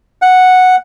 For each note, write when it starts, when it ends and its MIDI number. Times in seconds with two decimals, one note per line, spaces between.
0.22 0.76 78